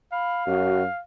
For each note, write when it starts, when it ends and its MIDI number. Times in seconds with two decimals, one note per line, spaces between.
0.12 0.98 77
0.12 0.44 83
0.47 0.84 42
0.47 0.82 66